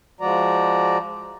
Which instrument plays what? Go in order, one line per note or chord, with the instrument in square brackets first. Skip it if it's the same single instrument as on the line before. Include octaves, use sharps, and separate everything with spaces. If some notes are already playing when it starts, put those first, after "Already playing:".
[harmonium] F3 G#3 F#4 D5 A#5